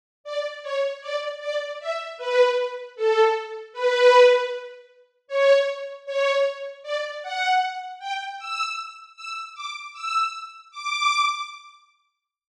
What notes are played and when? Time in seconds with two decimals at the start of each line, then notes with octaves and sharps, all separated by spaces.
0.24 D5
0.62 C#5
1.01 D5
1.40 D5
1.80 E5
2.17 B4
2.96 A4
3.73 B4
5.28 C#5
6.06 C#5
6.83 D5
7.22 F#5
7.99 G5
8.39 E6
9.16 E6
9.54 D6
9.93 E6
10.71 D6